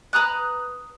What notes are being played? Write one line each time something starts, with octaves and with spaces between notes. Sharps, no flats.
B4 A#5 D#6 F#6